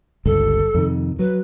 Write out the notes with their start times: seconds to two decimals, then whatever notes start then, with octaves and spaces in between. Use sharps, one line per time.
0.26 G1 C#2 G2 A4
0.74 F2 C3 D#3
1.19 F#3 B4